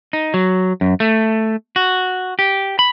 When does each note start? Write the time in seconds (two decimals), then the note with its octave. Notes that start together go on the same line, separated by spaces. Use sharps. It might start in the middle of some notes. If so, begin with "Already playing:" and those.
0.13 D#4
0.34 F#3
0.81 F#2
1.00 A3
1.76 F#4
2.39 G4
2.79 B5